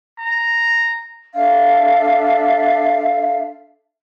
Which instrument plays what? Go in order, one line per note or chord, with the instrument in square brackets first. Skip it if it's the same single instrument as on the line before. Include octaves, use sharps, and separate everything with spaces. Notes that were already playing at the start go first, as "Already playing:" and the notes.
[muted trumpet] A#5
[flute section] D4 A4 E5 F5